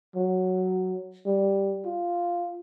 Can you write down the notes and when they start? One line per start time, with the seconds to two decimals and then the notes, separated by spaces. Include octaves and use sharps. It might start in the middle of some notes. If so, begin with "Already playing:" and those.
0.15 F#3
1.26 G3
1.85 F4